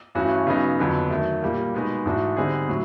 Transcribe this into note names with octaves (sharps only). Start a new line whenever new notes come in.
G2 E3 A3 C#4 F#4
C#3 F#3 B3 D#4
F2 D3 F#3 B3
D#3 F#3 A3
A#2 G3 A#3
B2 G#3 B3 D#4 F#4
G#2 E3 A3 D4 F#4
D3 G3 C4 D#4 G#4
A2 F#3